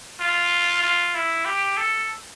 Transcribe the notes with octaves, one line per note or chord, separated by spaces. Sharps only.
F4
F4
E4
G4
A4